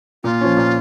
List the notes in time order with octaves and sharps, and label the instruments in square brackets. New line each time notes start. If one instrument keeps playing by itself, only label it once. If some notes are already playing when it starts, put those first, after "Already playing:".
[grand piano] A#2 [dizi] F4
[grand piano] F3 C#4
A#2